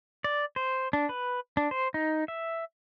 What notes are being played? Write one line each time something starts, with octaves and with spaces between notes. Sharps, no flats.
D5
C5
D4
B4
D4
C5
D#4
E5